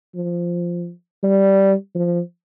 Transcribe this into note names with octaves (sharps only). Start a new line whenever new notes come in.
F3
G3
F3